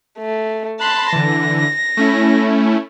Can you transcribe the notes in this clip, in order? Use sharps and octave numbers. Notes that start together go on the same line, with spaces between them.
A3
A5 B5 C6 F#6
D3 E3 A#6
A3 C#4 E4